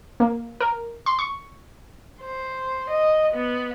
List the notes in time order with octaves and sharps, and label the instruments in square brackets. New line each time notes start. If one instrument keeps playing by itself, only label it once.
[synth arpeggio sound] A#3
A#4
C6
C#6
[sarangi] C5
D#5
B3